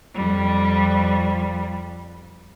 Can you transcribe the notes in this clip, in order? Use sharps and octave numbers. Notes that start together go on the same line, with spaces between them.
F2 G3